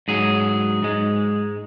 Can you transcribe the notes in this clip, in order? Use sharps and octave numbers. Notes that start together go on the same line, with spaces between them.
G#2 F#3 G#4
G#2 G#3